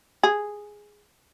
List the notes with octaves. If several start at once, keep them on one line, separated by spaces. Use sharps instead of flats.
G#4